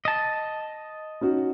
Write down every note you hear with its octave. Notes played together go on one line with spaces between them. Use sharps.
D#5 A5
C#4 D#4 F#4